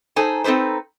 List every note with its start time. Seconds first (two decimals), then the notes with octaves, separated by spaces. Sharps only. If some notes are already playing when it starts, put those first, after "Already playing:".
0.16 D#4 G#4 A4 C5 G#5
0.44 C4 D#4 A4 B4 C5